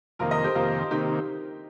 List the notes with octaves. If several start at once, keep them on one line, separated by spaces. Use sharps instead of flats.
F2 C3 D#3 A#3 F4 A#4
A#4 D#5
G4 C5
F2 C3 D#3 A#3 F4 A#4
C3 D#3 A#3 D#4 G4